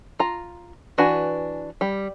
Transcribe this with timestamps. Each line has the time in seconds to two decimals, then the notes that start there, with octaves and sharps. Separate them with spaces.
0.19 F4 A#5
0.98 E3 D4 F#4 B4 G#5
1.81 G3